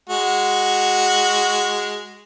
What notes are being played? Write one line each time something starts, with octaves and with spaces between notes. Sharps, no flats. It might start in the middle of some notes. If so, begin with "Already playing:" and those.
G#3 F#4